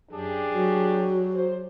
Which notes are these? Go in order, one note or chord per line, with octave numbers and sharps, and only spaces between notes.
F#2 D4 G4 G#4
F#3 F#4
C5